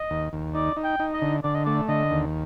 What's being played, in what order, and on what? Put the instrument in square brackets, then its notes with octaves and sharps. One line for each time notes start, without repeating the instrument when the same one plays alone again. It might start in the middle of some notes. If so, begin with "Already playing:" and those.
Already playing: [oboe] D#5
[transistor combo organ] D#2
D#2
[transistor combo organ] D#4 [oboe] D5
[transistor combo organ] D#4
[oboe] G5
[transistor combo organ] D#4
[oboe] D#5
[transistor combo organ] D3
[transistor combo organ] D3 [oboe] D5
[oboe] D#5
[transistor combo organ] A3 [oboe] D5
[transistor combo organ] D3 [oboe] D#5
[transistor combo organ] D#2